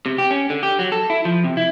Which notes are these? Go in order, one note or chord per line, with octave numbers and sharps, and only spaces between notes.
C3
G4
C#4
D3
G4
F#3
A4
E4
F3
C3
E4